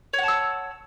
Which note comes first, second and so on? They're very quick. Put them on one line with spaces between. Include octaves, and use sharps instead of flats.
C#5 F#5 A5 E6